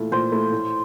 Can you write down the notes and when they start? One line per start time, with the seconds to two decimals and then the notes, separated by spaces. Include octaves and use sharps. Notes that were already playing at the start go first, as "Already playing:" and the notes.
Already playing: A#2 A3 E4
0.12 A#2 C5
0.32 A3 E4
0.52 A2